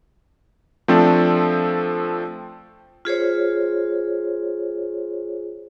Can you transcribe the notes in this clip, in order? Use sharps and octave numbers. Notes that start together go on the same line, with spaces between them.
F3 A3 C4 D4 A4
F4 G#4 C5 C#5